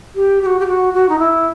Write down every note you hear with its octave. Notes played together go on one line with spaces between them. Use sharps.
G4
G4
F#4
G4
F#4
F#4
D#4
E4